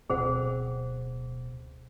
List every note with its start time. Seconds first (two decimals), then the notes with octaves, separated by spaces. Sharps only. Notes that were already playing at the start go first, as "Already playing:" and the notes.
0.10 D1 B2 C4 G#4 C5 F#5